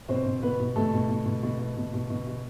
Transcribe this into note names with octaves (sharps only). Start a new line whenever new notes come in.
B2 C4 C5
B2
B2 B3 B4
B2
B2 A3 A4
B2
B2
B2
B2
B2
B2
B2
B2
B2